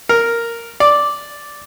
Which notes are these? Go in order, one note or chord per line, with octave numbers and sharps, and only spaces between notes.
A#4
D5